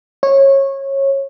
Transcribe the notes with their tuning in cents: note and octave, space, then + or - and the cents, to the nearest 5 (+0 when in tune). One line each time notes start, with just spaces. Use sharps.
C#5 -20